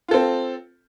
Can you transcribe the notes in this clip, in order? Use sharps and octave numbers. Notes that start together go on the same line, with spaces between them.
C4 F4 A4